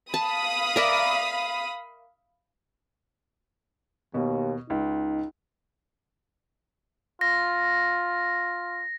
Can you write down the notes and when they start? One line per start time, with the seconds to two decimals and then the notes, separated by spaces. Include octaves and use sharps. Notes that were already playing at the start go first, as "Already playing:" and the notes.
0.14 F5 A5 B5 D#6
0.76 A#4 D5 E5
4.14 D#2 B2
4.70 C#2 D#4
7.21 F4 A#6